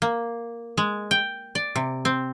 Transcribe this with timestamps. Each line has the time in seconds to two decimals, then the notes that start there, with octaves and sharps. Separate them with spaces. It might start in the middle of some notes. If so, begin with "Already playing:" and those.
0.02 A#3
0.77 G#3
1.11 G5
1.55 D5
1.76 C3
2.05 C4